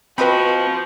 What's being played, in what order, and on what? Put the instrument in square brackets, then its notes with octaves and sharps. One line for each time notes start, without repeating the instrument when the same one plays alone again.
[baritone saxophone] F3 [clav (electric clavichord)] C4 [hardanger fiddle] F#4 [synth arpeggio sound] B4 D#5 B5